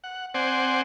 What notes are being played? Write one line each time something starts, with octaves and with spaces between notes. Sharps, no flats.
F#5
C4 C5 D5 F#5 G#5